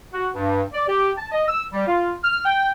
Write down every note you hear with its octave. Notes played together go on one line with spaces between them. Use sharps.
F#4
G2
D5
G4
A5
D#5
E6
G3
F4
F6
G5